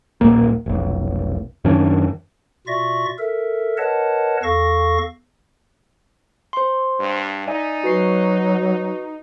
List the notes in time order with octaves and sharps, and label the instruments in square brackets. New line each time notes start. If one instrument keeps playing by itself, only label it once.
[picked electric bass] D#1 B1 A#2 A#3
F1 B1
F#2 D#3 C#4 D4
[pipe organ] B2 F4 D5 E5 C#6 A#6
A4 A#4 E5
A#4 B4 C#5 D#5 F#5 A5
E2 A4 F5 C#6 A#6
[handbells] C5 C6
[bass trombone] G2
[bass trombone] D#4 [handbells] D5 E5 G#5
[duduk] F#3 [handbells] F#4 B4 C7